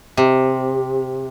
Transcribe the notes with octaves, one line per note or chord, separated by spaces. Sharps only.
C3